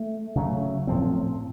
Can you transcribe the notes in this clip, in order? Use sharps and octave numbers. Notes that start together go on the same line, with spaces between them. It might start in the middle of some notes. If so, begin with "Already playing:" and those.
Already playing: A3
C#3 F#3 A3
A2 F3 C4